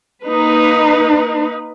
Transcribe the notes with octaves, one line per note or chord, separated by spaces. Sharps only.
A#3 D#4 B4